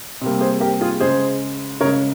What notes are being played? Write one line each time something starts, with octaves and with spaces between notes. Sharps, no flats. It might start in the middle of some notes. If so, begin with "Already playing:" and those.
C3 G3 A#3
G#4 C5
G4 A#4
F4 G#4
C#3 G#3 G#4 C5
C#3 G#3 A#4 C#5